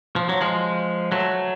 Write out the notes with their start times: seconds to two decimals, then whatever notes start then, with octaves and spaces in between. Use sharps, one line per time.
0.16 F3
0.29 F#3
0.41 F3 G#3
1.12 F#3 A3